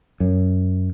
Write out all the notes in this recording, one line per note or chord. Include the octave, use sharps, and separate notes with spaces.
F#2